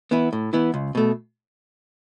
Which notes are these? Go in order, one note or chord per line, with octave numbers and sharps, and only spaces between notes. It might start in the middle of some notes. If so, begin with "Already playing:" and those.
E3 B3 E4
A2
E3 B3 E4
C#2
B2 A3